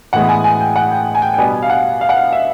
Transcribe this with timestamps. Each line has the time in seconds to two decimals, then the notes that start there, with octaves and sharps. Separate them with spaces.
0.13 A2 E3 G#3 B3 F#5
0.29 G#5
0.44 G#5
0.60 G5
0.76 F#5
0.91 G5
1.15 G#5
1.22 G5
1.34 G5
1.38 B2 G3 B3 D4 G#5
1.63 F5
1.70 F#5
2.01 F5
2.09 F#5
2.17 F5
2.33 E5